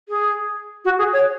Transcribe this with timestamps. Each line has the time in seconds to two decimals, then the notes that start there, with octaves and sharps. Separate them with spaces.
0.09 G#4
0.85 F#4
0.99 G#4
1.13 C#5